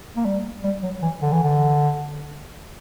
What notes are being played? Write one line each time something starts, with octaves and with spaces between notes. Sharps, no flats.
A#3
G3
G3
F#3
E3
D3
E3
D3